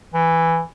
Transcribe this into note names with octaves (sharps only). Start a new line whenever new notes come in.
E3